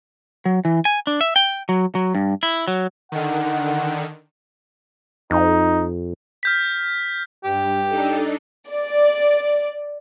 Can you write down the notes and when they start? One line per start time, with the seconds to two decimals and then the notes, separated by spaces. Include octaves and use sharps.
0.45 F#3
0.65 E3
0.85 G#5
1.07 D4
1.21 E5
1.36 G5
1.69 F#3
1.95 F#3
2.15 G2
2.43 E4
2.68 F#3
3.12 D3 D#3 F#5
5.31 F2 D#4
6.43 F6 G6 B6
7.44 G2 G4
7.88 D4 D#4 A4
8.69 D5